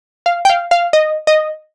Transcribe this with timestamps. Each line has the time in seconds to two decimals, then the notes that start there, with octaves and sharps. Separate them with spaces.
0.26 F5
0.45 G5
0.50 F5
0.71 F5
0.93 D#5
1.27 D#5